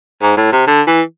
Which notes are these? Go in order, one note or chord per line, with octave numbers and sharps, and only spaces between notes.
G#2
A2
C3
D3
E3